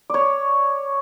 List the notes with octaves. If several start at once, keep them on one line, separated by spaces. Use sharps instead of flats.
C#5 D5